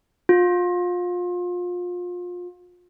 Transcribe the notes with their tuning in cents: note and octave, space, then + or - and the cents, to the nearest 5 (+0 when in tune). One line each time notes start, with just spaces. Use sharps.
F4 +30